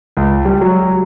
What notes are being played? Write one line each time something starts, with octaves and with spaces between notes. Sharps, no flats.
C#2
G3
F#3